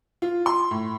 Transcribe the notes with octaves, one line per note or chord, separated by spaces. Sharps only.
F4
C6
A2